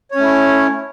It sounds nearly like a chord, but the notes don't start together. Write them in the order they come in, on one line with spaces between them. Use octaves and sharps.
C#5 C#4 A3 E4